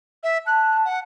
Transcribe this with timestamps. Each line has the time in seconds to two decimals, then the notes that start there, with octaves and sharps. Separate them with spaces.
0.23 E5
0.47 A5 F#6
0.85 F#5